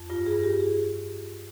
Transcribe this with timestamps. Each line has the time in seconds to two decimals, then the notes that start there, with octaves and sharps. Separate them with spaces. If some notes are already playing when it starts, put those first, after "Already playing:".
Already playing: F2
0.10 G2 F4
0.26 G#4
0.32 G2
0.44 G4
0.60 G#4